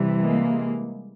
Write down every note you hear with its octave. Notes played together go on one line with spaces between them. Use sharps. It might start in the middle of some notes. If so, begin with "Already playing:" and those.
Already playing: C3 E3 G3
G#3 A#3